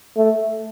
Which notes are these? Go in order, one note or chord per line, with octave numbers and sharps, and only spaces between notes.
A3